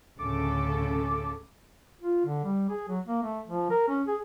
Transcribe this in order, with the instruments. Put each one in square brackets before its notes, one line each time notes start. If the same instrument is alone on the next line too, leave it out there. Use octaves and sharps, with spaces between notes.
[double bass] D2 A2 [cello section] C#3 C#4 A4 [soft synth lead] D6
[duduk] F4
D3
G3
G#4
F#3
A#3
A3
F3
A#4
C#4
G#4